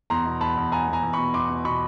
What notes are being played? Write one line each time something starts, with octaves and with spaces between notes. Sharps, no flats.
E2 A#5 C6
B2
E2 A5 B5
E2
E2 G#5 A#5
E2
G#5 A#5
E2
B2 B5 C#6
E2 C6 D6
B2
B2 B5 C#6